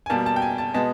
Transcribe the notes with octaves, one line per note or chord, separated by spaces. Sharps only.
G#5
B2 G3 A#3 A5
A5
G5
G#5
A5
B2 G#3 B3 A5